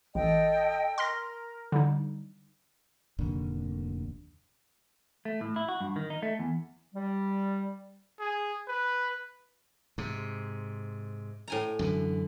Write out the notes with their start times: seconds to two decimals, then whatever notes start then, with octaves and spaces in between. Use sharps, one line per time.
0.15 A1 A4 D#5 G5
0.98 A#4 C6 F6 A#6
1.72 D3 G3 D#4
3.19 F1 D#2 A#2 D3
5.25 A3
5.41 A2
5.56 E4
5.68 F#4
5.81 G2
5.96 D#3
6.10 D#4
6.23 A3
6.39 E2
6.95 G3
8.20 G#4
8.68 B4
9.98 G#2 C3
11.48 A2 G#5 A#5
11.79 F#2 D3 E3